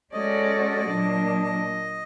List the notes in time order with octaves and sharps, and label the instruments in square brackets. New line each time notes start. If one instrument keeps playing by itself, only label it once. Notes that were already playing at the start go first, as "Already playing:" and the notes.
[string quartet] G#3 C#4 F#4 A4 D5 [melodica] D#5
[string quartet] A#2 F#3 A#3 D4